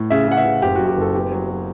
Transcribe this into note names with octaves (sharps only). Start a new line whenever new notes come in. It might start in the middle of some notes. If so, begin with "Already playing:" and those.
Already playing: A2
C#3 E5
C#3 F#5
E5
C#3
F#1 G4
F#2 F#4
G4
F#1 A4
B3 G4
F#3
F#3